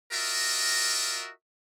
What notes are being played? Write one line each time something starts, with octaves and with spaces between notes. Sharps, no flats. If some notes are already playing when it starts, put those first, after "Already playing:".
F4 F#4 A#4 D#5 E5